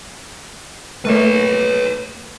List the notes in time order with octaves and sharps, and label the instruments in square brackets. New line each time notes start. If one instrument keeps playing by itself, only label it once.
[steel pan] A3 A#3 [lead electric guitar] B4 C#5